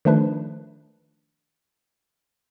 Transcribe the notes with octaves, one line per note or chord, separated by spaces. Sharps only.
D#3 F3 A3 D4 B4